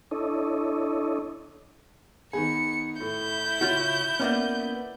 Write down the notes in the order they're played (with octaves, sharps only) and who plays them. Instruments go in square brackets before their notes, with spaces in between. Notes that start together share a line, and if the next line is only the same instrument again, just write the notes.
[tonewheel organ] D4 E4 A4 C#5 D#5
[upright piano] D#3 B3 G#4 [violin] C#7
[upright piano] A2 [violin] E4 G6
[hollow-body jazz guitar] C#3 F4 F#4
[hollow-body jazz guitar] A#3 B3 C#4 [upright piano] D5 E5